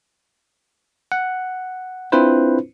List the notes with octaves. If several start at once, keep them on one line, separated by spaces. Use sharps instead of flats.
F#5
C4 D4 E4 F4 B4 C5